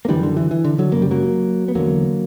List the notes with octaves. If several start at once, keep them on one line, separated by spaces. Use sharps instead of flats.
A#3
F#2 D3 E3 G3
D3
E3
E3
D3
D3 F#3
F#2 C#3 A#3
G3
F#3 A#3
B3
E2 D3 F#3 A#3